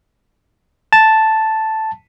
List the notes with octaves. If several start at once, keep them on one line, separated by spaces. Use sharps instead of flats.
A5